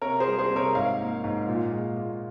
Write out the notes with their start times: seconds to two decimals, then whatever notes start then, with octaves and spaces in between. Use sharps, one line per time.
0.02 C3 A#4 C#5
0.20 G#4 C5
0.27 G3
0.38 G#4 C5
0.51 C3
0.56 A#4 C#5
0.75 G#2 C#5 F5
1.00 A#3
1.24 G#2
1.48 A#2
1.72 G#3
1.97 A#2